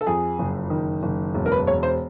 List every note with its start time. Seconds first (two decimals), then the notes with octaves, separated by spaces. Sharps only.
0.01 A4
0.07 F2 G#4
0.39 F#1
0.70 D#3
1.03 F#1
1.34 E1
1.46 A#4
1.52 B4
1.67 E1 C#5
1.83 C5